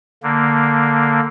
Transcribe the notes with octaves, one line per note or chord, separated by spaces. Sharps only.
D3 A#3